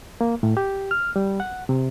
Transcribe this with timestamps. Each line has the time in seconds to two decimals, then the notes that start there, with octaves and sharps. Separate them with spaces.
0.21 A#3
0.43 A2
0.57 G4
0.91 F6
1.16 G3
1.40 F#5
1.69 C3